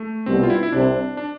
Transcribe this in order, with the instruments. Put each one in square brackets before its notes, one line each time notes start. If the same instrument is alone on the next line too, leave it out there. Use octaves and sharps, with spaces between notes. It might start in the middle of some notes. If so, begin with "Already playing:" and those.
Already playing: [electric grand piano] A3
[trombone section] C2 B2 G3 B3 [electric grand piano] C4
[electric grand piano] F4
E4
E4
[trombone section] C2 C3 G3 C4 [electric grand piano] D4
[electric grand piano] D4